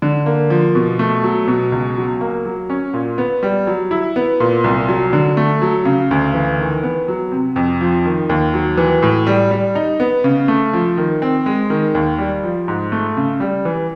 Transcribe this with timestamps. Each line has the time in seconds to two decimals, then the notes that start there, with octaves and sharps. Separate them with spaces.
0.02 D3
0.26 A#3
0.50 F3
0.75 B2
0.99 A3
1.24 F#3
1.48 B2
1.72 C#2
1.97 F#3
2.21 A#3
2.45 F#3
2.70 C#4
2.94 A#2
3.18 B3
3.43 G3
3.67 F#3
3.91 E4
4.16 B3
4.40 A#2
4.64 C2
4.88 F#3
5.13 D3
5.37 A3
5.62 F#3
5.85 C#3
6.11 D2
6.34 E3
6.59 D#3
6.83 B3
7.08 F#3
7.32 C3
7.56 F2
7.81 F3
8.05 D#3
8.29 D#2
8.54 F#3
8.78 E3
9.03 A2
9.27 G3
9.51 G3
9.75 D#4
10.00 B3
10.24 C#3
10.48 A3
10.73 F3
10.97 D#3
11.22 C4
11.46 G#3
11.70 D#3
11.95 D#2
12.18 G3
12.43 F3
12.68 G#2
12.92 A3
13.17 C#3
13.40 G3
13.65 E3